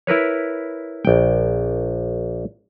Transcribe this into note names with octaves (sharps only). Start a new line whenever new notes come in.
E4 A#4 B4 C#5
A#1 G5